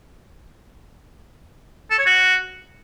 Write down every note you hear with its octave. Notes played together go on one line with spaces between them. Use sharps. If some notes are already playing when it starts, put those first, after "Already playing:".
A4
C#5
F#4